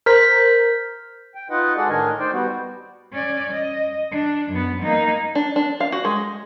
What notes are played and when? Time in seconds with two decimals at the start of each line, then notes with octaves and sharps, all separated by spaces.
0.06 A#4 C5 F6 G6 B6
1.35 G5
1.50 D#4 F4 B4 D#5 F#5
1.77 G#3 F#4 G#4 A4 D5 F#5
1.89 A2 D#3 D4 A#4 D#5 G#5
2.19 D#4 C5 D5 G5
2.32 G3 B3 F#4
3.12 C#4 D5
3.51 D#5
4.11 D4
4.50 F#2 B3
4.83 A#3 D#4
5.35 D4
5.56 D4
5.80 F5
5.92 F#4
6.05 G#3